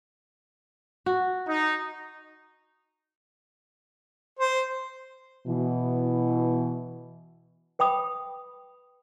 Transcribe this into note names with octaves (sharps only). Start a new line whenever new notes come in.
F#4
D#4
C5
B2 E3
B4 G5 B5 D#6